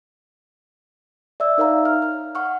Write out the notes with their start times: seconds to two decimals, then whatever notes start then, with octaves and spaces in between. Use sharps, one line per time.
1.40 D5 E5 E6
1.58 D#4 A#4 C#5 F5 A#5
1.85 F6
2.02 F6
2.35 F#5 C#6 F6